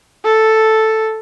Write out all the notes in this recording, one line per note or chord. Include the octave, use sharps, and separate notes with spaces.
A4